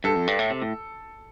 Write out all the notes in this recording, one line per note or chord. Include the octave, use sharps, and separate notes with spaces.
G2 A4
F2
G2
A2
C3
A2